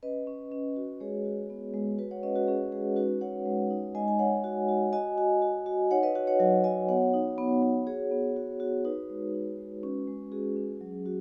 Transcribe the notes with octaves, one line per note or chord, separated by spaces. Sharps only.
C#4 B4 D#5
C#4
C#4
F#4
G#3 G#4 C#5
F#4
B3
G#3
G#3 F#4 B4
C#5 F#5
C#4 B4 D#5
F#4 B4
C#4 G#4
G#3 G#4
D#4 F#4 B4
F#4 C#5 F#5
G#3
D#4
G#3 D#5 G#5
G#5
G#3 C#5 F#5
F#4
F#4
F#4 D#5 G#5
F#4
F#4
F#4
D#4 C#5 F#5
B4 D#5
F#4 C#5 F#5
C#5 F#5
F#3 C#5 F#5
F#4 D#5 G#5
B3 C#5 F#5
D#4
B3
B3
F#4 G#4 C#5
B3
F#4
F#4
D#4 F#4 B4
G#3
D#4
G#3
C#4
G#3
F#4 G#4
C#4
F#3
F#4